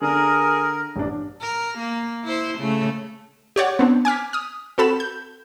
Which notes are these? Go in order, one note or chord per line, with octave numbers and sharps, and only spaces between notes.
D3 D4 G#4 A#4
A1 G2 D4
A#4
A#3
E4 C5
C#3 A3
G4 C#5 D5 F#5
B3 C4 D4
G#5 D6 F6 B6
D#6 F6
C4 F#4 A4 B5 E7
G6